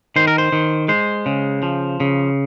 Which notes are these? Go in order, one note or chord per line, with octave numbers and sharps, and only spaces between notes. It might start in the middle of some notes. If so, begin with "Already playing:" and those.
D#3 C5
A#4
C5
D#3
G#3 C5
C#3
F3
C#3